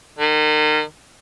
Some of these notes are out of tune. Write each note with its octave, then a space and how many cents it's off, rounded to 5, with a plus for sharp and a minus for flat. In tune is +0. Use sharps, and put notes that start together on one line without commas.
D#3 -30